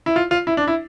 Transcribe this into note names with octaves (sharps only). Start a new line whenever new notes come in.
E4
F4
F4
E4
D4
E4